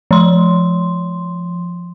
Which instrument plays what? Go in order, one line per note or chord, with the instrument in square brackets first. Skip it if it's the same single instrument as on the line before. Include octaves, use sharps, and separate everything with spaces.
[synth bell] F3 C6